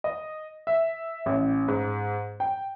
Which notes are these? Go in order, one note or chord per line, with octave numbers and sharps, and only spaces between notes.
D#5
E5
A1
G#2
G5